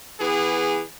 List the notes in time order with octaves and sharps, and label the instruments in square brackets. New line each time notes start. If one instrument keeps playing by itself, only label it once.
[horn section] E3 B3 G#4